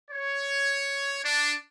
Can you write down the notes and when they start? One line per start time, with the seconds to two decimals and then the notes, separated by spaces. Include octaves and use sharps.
0.11 C#5
1.24 D4